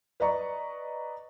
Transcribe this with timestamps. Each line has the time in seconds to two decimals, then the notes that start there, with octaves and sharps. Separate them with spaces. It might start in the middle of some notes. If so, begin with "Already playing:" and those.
0.20 B4 D5 D#5 A#5 C#6